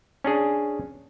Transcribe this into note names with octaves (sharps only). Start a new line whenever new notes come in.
C#4 D4 G#4